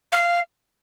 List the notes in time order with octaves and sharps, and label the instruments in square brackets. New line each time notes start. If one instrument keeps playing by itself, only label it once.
[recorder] F5